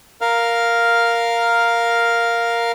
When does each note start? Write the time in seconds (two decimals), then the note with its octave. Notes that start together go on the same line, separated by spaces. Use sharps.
0.21 A#4 F5 F6